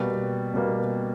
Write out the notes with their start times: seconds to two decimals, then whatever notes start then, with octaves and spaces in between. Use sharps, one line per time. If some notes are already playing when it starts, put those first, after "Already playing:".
Already playing: B2 G3 A#3
0.54 B2 G3 A#3